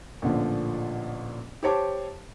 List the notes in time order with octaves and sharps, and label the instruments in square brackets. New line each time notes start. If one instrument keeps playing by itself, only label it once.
[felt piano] A1 A#2 D3 F3
G4 C5 C#5 A5 D6